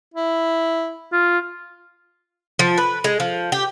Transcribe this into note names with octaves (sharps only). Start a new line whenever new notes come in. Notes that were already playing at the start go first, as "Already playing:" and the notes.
E4
F4
F3
B4
G#3
F3
G4